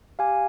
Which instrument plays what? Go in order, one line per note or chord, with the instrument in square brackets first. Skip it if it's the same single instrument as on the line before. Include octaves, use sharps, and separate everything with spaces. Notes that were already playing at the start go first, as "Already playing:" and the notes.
[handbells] G4 F5 G#5